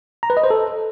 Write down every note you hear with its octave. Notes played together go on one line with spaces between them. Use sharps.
A#5
B4
D#5
C5
A4